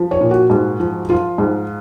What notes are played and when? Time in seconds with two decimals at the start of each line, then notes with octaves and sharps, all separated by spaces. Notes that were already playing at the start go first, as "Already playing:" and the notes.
Already playing: F3
0.11 C#5
0.21 A#2
0.31 F#4
0.50 G#2
0.80 F3
1.09 F3 F4
1.38 G#2